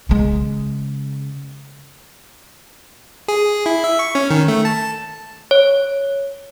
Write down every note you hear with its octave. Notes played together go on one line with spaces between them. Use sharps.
C#3 G#3
G#4
E4
E5
C#6
C#4
D#3
A3
A5
C#5